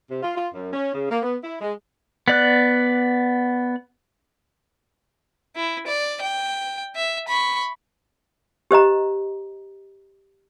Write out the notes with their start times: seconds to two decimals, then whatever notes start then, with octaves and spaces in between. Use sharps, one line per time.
0.10 C3
0.23 F4
0.36 F4
0.54 F#2
0.73 C#4
0.94 C#3
1.10 A#3
1.22 B3
1.43 E4
1.61 G#3
2.28 B3 D5 F#6
5.56 E4
5.87 D5
6.22 G5
6.95 E5
7.28 B5 C#6
8.71 G4 C5 D#5 A#5